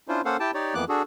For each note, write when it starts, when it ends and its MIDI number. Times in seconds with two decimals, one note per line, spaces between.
0.08 0.21 61
0.08 0.21 62
0.08 0.21 64
0.08 0.21 65
0.08 0.21 72
0.25 0.37 58
0.25 0.37 61
0.25 0.37 69
0.25 0.37 72
0.25 0.37 77
0.25 0.37 78
0.40 0.51 64
0.40 0.51 67
0.40 0.51 79
0.40 0.51 81
0.54 0.74 63
0.54 0.74 67
0.54 0.74 73
0.54 0.74 74
0.75 0.85 41
0.75 0.85 52
0.75 0.85 58
0.75 0.85 59
0.75 0.85 86
0.75 0.85 90
0.89 1.02 62
0.89 1.02 66
0.89 1.02 68
0.89 1.02 69